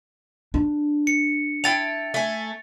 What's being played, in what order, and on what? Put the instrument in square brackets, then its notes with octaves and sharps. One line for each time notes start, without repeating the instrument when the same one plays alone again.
[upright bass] D4
[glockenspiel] C#7
[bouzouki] E4 G5 A5 [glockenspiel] A6 F7
[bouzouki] A3 G#5